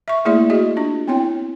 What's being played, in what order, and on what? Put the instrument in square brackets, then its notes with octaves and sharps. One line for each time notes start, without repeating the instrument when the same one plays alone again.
[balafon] E5 C#6
A3 A#3 E4 G#4 D5 E5
F#4 G#4 D#5
D4 F4
B3 C4 E4 C#5 G5